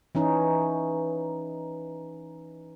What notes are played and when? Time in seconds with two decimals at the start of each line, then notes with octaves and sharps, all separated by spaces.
0.15 E3 C#4 D#4